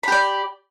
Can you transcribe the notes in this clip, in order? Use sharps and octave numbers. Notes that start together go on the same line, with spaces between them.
G4 D5 B5